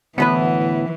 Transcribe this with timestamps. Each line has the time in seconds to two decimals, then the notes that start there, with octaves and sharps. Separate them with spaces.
0.18 D2 A2 E3 B3 B4